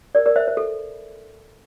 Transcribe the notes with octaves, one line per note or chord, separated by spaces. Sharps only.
A#4 D5
A#4 D5
C5 E5
C5
A4